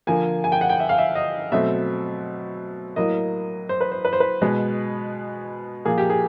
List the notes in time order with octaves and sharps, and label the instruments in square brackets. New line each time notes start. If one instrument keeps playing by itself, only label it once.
[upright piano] D3 F3 A#3 G#5
G#5
G5
F#5
G5
E5
F5
E5
D#5
B2 F#3 A3 C4 E5
A2 F#3 A#3 D#5
C5
B4
C5
B4
C5
B4
B2 G#3 B3
A#2 F3 A#3 G#4
G4
G#4